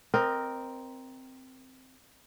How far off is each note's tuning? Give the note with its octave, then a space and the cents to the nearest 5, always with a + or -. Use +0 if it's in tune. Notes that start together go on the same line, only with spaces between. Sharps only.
C4 -5 A#4 +10 D#5 -25